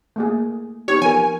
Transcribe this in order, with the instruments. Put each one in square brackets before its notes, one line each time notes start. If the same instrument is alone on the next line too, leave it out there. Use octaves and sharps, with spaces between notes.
[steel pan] A3 A#3 G#4
[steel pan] B3 D#4 G4 [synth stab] C#5
[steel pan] F3 A#4 [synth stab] G#5